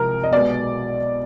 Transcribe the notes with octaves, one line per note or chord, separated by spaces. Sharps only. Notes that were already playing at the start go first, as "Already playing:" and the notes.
Already playing: C2 C3 F3 G#3 A#4
D#5
B1 B2 G#3 B3 D5